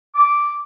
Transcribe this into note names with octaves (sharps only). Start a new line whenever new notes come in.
D6